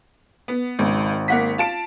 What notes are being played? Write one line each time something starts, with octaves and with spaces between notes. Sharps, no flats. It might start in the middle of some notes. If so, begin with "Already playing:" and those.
B3
G#1 C#2
A#3 F#5 B6
F4 A5 D7